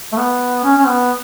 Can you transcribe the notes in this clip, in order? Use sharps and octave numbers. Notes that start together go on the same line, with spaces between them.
A3
B3
C#4
C#4
B3